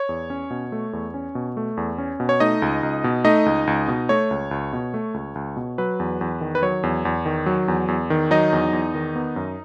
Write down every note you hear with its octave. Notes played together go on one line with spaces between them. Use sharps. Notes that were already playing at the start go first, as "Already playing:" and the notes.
Already playing: C#5
E2
C#4
B2
A3
E2
C#4
B2
A3
E2
C#4
B2
C#5
A3 D#4 D#5
C#2
C#2
B2
A3 D#4 D#5
C#2
C#2
B2
A3 C#5
C#2
C#2
B2
A3
C#2
C#2
B2
F#3 B4
E2
E2
D#3
B4
F#3 C#5
E2
E2
D#3
F#3
E2
E2
D#3
F#3 D#4 D#5
E2
E2
D#3
B3
F#2